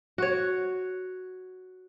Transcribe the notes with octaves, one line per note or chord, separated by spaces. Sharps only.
F#4 C#5